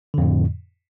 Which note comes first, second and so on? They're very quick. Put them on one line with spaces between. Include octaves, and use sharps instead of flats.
D3 F2 A2